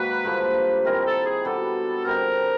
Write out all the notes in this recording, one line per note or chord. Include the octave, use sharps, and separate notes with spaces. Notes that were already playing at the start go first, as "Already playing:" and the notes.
Already playing: G#2 D#3 F#3 A#3 B4
G2 D3 F3 A#3
D#3 G#3 C4 E4 A#4
A4
G#4
B2 G3 B3 D4 A4
D3 G3 C4 D#4 A#4